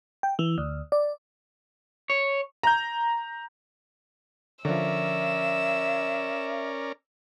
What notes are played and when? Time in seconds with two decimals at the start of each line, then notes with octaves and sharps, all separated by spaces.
0.23 G5
0.39 E3
0.58 D2
0.92 D5
2.10 C#5
2.63 A#5 G6
4.65 D3 F3 C#4 A#4 D5 E5 E6